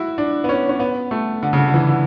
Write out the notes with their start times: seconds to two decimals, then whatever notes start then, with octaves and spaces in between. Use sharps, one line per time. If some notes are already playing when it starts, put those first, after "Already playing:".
Already playing: E4 F#4
0.18 D4
0.44 B3
0.49 C#4
0.69 C#4
0.80 B3
1.11 A3
1.43 D3
1.53 C#3
1.57 D3
1.68 D3
1.74 E3
1.89 D3